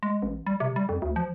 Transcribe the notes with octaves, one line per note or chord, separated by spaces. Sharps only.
G#3
A1
G3
C3
G3
F2
D2
F3